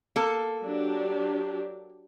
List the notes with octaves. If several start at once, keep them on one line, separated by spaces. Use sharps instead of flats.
A#3 A4
F#3 D4 G4